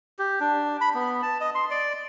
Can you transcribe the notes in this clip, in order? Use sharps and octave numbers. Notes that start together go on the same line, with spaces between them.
G4
D4
B5
B3
A5
D#5
C6
D5